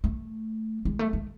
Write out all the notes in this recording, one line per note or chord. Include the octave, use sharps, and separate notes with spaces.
A3
G#3
A3
G#3